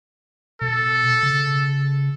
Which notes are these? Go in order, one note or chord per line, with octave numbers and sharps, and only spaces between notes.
B2 A4
C#3